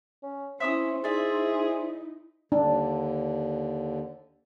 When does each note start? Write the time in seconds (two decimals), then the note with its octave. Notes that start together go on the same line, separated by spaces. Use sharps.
0.23 C#4
0.60 C#4 E4 C5 E5 D#6 E6
1.04 D#4 E4 G#4 D5 E5
2.52 D#2 D3 D4